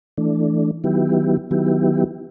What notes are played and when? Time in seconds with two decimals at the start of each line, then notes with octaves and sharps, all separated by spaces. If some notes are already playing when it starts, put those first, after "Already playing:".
0.18 E3 A3 D4
0.84 D#3 F#3 B3 E4 G4
1.51 D#3 F#3 B3 E4 G4